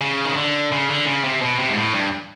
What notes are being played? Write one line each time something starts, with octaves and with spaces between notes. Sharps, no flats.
C#3
D#3
D3
C#3
D3
C#3
C3
B2
C3
G#2
A2
G2